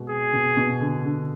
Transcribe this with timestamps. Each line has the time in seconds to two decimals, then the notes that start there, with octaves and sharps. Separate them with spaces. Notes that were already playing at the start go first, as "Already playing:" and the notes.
Already playing: B2 G#3
0.09 G#4
0.33 B2
0.57 B2
0.81 D3
1.05 D3